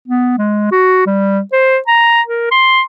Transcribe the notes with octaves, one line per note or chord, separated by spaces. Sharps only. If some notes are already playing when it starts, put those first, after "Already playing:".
B3
G#3
F#4
G3
C5
A#5
A#4
C6